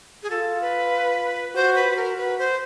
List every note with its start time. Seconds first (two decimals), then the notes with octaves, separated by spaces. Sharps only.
0.23 G#4
0.30 F4 A4
0.61 B4
1.55 F#4 C5
1.75 B4
1.86 F#4
1.96 A#4
2.17 F#4 B4
2.38 C5